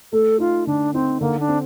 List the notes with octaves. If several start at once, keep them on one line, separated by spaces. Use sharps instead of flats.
A3 A4
D#4 F4
D3 D4
C4 D#4
D3 A#3
D4
C4